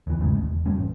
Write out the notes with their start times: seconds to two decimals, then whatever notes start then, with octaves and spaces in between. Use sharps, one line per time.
0.07 D#2 E3
0.20 G#1 E2 C#3 G#3
0.35 D2
0.47 E1
0.66 F2 G3 A3 C#4
0.79 A1